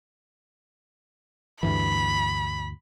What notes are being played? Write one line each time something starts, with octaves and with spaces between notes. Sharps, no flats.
D2 G2 E3 B5